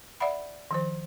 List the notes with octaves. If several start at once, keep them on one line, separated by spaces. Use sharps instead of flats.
D5 E5 F#5 B5
D#3 F3 C5